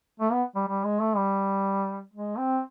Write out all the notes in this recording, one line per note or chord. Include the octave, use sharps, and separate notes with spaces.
A3
B3
G3
G3
G#3
A3
G3
G#3
C4